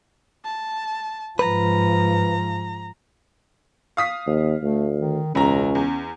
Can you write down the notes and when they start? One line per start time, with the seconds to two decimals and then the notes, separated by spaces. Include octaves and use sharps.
0.44 A5
1.39 G#2 F3 B4 A#5
3.97 F5 D#6 B6
4.27 D#2
4.62 D2 A3
5.01 D#3
5.35 E1 C#2 C#4 A#5
5.75 E2